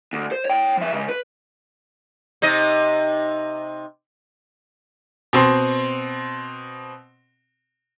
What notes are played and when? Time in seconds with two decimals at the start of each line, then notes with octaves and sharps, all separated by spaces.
0.13 D2
0.32 C5
0.45 C#5 G5
0.77 F3 E5
0.93 C#3 G#3
1.09 B4
2.42 C3 D#4 D#5
5.33 B2 C4 C6